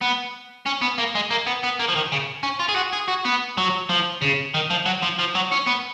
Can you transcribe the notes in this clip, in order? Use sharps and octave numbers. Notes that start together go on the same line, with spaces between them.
B3
C#4
B3
A#3
G#3
A#3
B3
B3
A#3
F3
D#3
C#3
C#4
F4
G#4
F#4
G#4
F#4
B3
F#3
F3
C#3
D#3
F3
F#3
F3
F3
F#3
C#4
B3